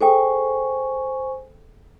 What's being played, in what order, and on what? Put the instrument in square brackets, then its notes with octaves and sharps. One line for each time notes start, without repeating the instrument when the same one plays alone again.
[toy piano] G#4 A4 G5 [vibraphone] C5 G#5 C#6